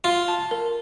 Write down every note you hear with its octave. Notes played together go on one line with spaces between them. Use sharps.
F4 C6
A5
A#4